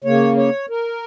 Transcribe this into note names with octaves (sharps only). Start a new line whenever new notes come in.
C#3 A#3 C#5
C#5
A#4